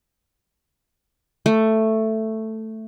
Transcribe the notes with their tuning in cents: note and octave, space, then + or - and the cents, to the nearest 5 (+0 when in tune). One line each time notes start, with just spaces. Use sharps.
A3 +5